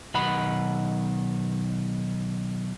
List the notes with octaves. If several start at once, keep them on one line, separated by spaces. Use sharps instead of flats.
B1 D#3 F#5 B5